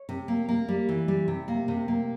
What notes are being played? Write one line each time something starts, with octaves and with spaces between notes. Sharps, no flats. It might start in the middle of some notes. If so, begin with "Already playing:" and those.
Already playing: C#5
C3
A#3
A#3
G3
E3
G3
C3
A#3
C3
A#3